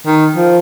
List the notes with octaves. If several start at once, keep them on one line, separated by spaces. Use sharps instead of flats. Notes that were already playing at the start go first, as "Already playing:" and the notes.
D#3
F3